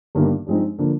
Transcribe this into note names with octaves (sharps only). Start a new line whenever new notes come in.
G1 G2 D#3 G3 A#3
G2 F3 G#3 C4 D#4
D3 F3 A#3